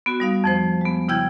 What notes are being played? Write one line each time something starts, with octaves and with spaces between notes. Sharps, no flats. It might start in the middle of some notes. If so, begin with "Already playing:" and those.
B3 F#4
G3 D#4 F5
F2 F3 C5
G#3 B3
C#3 E4 G5 G6 G#6